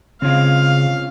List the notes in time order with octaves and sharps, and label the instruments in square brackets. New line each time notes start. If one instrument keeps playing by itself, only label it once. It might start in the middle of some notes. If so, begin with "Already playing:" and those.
[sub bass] C#3 [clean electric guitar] C4 C#4 F4 [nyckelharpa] F5